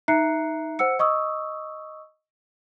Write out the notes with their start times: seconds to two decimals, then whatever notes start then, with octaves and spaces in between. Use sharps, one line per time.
0.08 D#4 E5 A#5 F#6 C7 C#7
0.79 C5 F#5 E6 C#7
0.99 D#5 C#6 D#6 E6